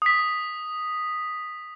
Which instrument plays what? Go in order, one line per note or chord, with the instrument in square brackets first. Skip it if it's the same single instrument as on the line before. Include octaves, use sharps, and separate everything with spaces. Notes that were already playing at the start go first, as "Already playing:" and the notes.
[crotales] D#6 B6